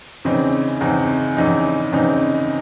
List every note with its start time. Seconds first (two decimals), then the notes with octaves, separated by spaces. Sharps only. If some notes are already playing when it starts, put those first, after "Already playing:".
0.25 E2 C#3 E3 C4 D#4
0.81 E2 C#3 E3 C4 D#4
1.37 E2 C#3 E3 C4 D#4
1.92 E2 C#3 E3 C4 D#4